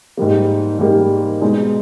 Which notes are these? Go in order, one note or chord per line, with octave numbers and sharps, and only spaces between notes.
G#2 G3 A#3
G#2 G3 A#3
B2 G#3 D#4 G#4